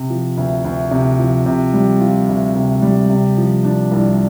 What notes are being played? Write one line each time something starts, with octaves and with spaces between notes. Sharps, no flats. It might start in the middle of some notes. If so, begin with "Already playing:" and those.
Already playing: C3
F3
D2
D2
C3
F3
C3
G3
F4
D2
C3
G3
C3
F3
D4
C2